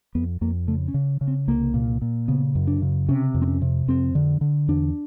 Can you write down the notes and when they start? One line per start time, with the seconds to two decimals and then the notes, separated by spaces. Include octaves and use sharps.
0.15 F2 B3
0.41 F2 A#3
0.67 C#3 A3
0.88 C#4
0.94 C#3
1.21 C#3
1.28 C4
1.48 C2 A#3
1.74 A#2
2.02 A#2
2.28 C#3 B3
2.55 F#2
2.67 D4
2.82 C#3
3.08 C3 C#4
3.34 F2
3.42 C4
3.48 C#4
3.62 C3
3.88 F2 C4
4.15 D3
4.41 D3
4.68 E2 D4